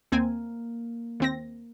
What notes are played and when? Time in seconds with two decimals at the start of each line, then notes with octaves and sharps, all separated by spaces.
0.12 D#2 A#3 C4 G#5
1.20 D#2 C4 A#6